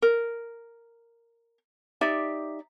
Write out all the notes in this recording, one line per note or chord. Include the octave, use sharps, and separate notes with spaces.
A#4
D#4 G4 D5 E5